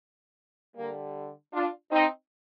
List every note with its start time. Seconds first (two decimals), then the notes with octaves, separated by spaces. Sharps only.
0.76 D3 G3 A#3
1.54 D4 F4
1.92 C4 D#4